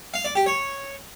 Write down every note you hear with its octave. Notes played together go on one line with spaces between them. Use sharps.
F5
D5
G4
C#5